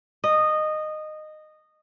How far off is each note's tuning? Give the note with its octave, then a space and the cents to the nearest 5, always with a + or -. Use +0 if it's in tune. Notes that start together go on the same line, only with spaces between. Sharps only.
D#5 -15